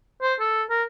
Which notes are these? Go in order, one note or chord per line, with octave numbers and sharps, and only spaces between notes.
C5
A4
A#4